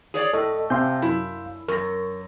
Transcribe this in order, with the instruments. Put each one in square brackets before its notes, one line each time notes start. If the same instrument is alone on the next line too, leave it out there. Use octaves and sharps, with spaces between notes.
[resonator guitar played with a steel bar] G#4 C#5 D5
[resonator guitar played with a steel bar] A2 [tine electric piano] A4 D#5 [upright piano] C#6
[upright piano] C3 C4 G#5 [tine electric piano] F5 C6 G6
[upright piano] F#2 [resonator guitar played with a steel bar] E4
[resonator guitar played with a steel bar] F#2 [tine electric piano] A#4 [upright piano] C#6 A#6